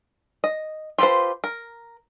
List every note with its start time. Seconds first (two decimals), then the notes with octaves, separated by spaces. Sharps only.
0.44 D#5
0.98 F4 G4 A4 B4 C5
1.44 A#4